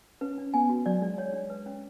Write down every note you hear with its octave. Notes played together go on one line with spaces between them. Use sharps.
C#4 B4
D4
B3 G#5
F#4
F#3 D5
G#3 D4
C#5
D4
B4
C#4